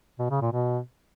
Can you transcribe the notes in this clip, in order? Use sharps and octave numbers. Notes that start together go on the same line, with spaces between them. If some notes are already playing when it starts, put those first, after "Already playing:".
B2
C#3
A#2
B2